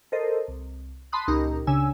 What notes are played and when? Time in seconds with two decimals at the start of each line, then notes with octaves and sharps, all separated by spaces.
0.12 A4 A#4 C5 D#5
0.48 C2
1.12 A5 B5 C6 D#6 F#6
1.28 C#2 A#2 D#4 G4 A#4 A#5
1.67 C#2 C#3 D4 G#5 E6